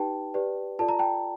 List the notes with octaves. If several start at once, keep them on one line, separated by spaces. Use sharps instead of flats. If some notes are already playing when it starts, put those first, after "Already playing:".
Already playing: D#4 G4 B4 G5 A5
G4 B4 D5
F4 A4 D5 A5
A#5
G5 A5